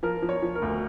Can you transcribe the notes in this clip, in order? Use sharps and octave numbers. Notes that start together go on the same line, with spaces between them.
F3 A#4
F3
C#5
F3
A#4
D2